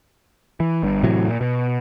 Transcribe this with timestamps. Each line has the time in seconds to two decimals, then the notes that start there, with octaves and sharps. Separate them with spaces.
0.60 E3
0.83 G1 G2
1.03 A2 C3 E3 F#3
1.28 A#2
1.41 B2